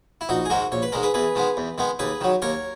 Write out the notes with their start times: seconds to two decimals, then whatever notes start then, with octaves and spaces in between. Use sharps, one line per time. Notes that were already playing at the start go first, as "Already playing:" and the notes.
0.21 E4
0.29 A#1 D#4 F#4
0.45 G#4
0.50 G#2 D#3 G#3 F#4 A#4
0.72 A#1 C#5
0.82 B4
0.92 G#2 D#3 G#3 A#4
1.03 G#4 B4
1.14 E2 G#4 B4
1.35 D#3 G#3 B3
1.57 E2
1.78 D#3 G#3 B3
1.99 D#2 G#4 B4
2.21 D#3 F#3
2.42 D#2 A#4 C#5